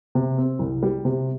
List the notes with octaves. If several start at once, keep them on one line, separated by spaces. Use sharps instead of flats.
C3
C4
C2
G3
C3